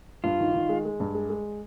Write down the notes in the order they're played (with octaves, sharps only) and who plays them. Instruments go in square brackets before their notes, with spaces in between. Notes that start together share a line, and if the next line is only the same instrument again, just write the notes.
[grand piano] G2 [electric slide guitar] F4
[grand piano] D#3
D#3
G#3
G#3
G2
G#3
G#3